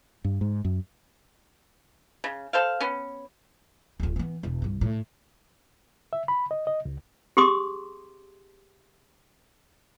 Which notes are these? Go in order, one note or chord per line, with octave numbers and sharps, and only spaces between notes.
G2
G#2
F#2
C#3
A4 C5 F5
B3 C#4
D1 F2
E3 B3
E1
C2 G2
A2
E5
B5
D#5
D#5
C#2
G4 G#4 C6 D6 D#6